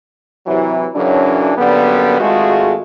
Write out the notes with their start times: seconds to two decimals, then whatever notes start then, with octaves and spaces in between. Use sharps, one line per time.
0.46 C3 E3 F#3
0.94 F#2 C#3 E3 F#3 D4
1.57 F#2 D3 G3 A#3 B3
2.20 G#1 G#3 A3 F4 F#4 G#4